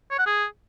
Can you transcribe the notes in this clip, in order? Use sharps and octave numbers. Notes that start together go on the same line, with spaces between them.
C#5
F#5
G#4